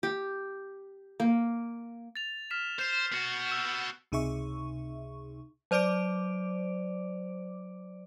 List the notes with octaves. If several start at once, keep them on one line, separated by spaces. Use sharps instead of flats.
G4
A#3
A6 F7
F6 B6 E7
C5 G6 C7
B3 F#4
E6 E7
C#2 C3 D#4 G#4 E5 C#6
F#3 C5 D5 D6 D7